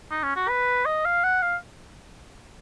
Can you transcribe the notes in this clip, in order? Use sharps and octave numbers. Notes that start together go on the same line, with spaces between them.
D#4
C#4
F#4
B4
D#5
F5
F#5
F5